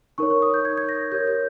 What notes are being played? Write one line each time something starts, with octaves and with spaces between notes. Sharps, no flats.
D#4 A#4 C#5 C#6
C#6
D#6
G6
G#6
G#6
A#6
G4 A#4 C#5 G6
G6